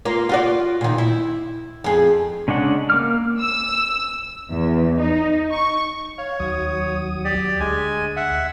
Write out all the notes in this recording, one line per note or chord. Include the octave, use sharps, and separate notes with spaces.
A#3 F4
F4 F#4 D5
A#2 D#3
E4
F2 G#4
C#3 G#3 D4 F#5
A#3 D6 F6
E6
E2
D#4
C#6
C#5 F5
D#2 F#3 D#6
G4 D5
D2 G#3 G#5
E5 F#5